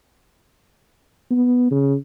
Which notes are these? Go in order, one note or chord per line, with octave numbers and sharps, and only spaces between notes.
B3
C#3